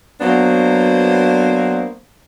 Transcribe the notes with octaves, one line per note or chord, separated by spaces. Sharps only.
F#3 A#3 B3 D4 C5